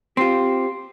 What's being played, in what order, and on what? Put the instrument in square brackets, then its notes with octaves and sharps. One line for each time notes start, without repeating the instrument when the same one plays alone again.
[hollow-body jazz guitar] C4 F4 [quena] G4 [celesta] C6 C7